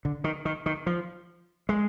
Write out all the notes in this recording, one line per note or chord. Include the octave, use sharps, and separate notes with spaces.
D3
D#3
D#3
D#3
F3
G#3